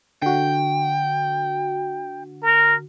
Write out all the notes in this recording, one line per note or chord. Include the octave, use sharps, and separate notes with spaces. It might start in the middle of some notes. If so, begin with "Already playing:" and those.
D3 F#4 G5
A#4